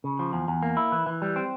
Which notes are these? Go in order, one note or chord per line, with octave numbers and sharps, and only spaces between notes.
C#3
F3
E2
E2
A#3
E4
E3
E3
G3
C4